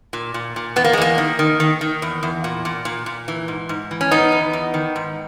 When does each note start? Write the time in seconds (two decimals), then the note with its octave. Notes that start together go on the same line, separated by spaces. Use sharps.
0.13 A#2
0.34 A#2
0.56 A#2
0.76 E2 B3
0.84 A#3
0.93 G#3
0.98 E2 A#3
1.18 D#3
1.39 D#3
1.60 D#3
1.81 D#3
2.02 E2
2.23 E2
2.44 A#2
2.65 A#2
2.85 A#2
3.06 A#2
3.28 E3
3.48 G#2
3.69 G#2
3.91 E3
4.01 C#4
4.11 D#3 B3 D#4
4.32 E2
4.53 E2
4.74 D#3
4.96 G#2